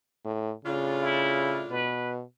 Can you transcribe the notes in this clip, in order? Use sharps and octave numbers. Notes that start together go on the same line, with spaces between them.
A2
A2 C#3 D4 F4
E4
B2 B4